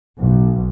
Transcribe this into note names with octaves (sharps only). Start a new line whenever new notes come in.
B1